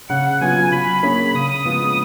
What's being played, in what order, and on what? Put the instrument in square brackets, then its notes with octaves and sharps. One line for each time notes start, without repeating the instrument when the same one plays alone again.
[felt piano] C#3 [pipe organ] F#5
[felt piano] F#3 B3 F4 [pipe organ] G#5
[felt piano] F#3 [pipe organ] B5
[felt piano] A#3 C#4 G#4 C#5 [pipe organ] B5
[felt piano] C#3 [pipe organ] D#6
[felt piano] F3 G#3 B3 F4